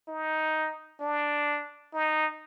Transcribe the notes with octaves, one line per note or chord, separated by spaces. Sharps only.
D#4
D4
D#4